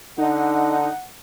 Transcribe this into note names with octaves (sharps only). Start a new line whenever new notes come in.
D3 D#4 F#5